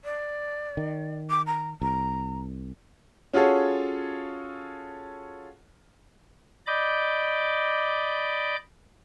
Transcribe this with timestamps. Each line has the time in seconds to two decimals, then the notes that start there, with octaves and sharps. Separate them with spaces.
0.04 D5
0.77 D#3
1.30 D6
1.46 A#5
1.82 C2 A#5
3.33 C#4 F4 F#4 G#4 A4 C#5
6.67 D5 D#5 B5 D6 G6